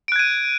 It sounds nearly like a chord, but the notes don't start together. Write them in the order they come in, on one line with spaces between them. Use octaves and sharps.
D7 F#6 G#6 D#7